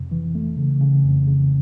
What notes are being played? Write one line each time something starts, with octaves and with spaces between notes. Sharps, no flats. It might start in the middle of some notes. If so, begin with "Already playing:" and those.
Already playing: F2 C3
E3
A3
C#3
C#3
F2
C#3